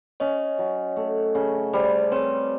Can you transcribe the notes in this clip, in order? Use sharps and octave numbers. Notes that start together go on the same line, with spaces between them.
C#4 C#5 D#5
F#3
A3
C#3
G3 C5 D5
C4 B4 C#5